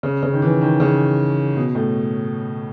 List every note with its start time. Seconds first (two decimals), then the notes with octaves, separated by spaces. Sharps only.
0.03 C#3
0.23 C#3
0.33 D#3
0.42 E3
0.61 D#3
0.80 C#3
1.56 B2
1.75 A2